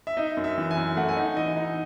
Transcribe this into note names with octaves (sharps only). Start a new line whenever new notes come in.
E5
D#4 D#5
F#2
E5
E3
G#5
F#2
A3 F#5
G#5
D#4 F#5
E3 D#5
D#4